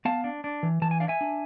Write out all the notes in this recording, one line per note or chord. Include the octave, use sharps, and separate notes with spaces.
B3 F5 A5
D4
D4
E3
E3 A5
G#5
D4 F5
E5 G#5
D4